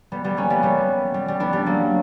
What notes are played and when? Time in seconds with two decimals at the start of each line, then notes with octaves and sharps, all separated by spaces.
0.12 G3 B3
0.24 G3 B3
0.37 A#3 C#4
0.50 G3 B3
0.63 G3 B3
1.14 G3
1.28 G3
1.40 B3 D4
1.53 G3
1.66 F#3 A#3